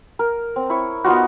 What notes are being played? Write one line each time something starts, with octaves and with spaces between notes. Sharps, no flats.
A#4
C4
E4 C#5
B3 D#4 F4 F#4